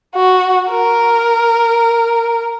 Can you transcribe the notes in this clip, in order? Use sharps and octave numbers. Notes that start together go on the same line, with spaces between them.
F#4
A#4